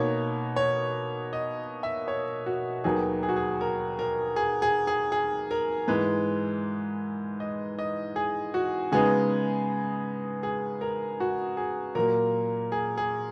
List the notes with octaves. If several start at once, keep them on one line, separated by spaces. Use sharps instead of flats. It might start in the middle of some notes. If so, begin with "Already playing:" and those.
Already playing: B2 A#3 D#4 C#5
C#5
D#5
E5
C#5
F#4
D#2 D#3 F#3 B3 D#4 G#4
G#4
F#4
G#4
A#4
A#4
G#4
G#4
G#4
G#4
A#4
G#2 E3 G#3 B4
D#5
D#5
G#4
F#4
C#3 G#3 B3 D#4 G#4
G#4
A#4
F#4
G#4
A#2 F#3 A#3 A#4
G#4
G#4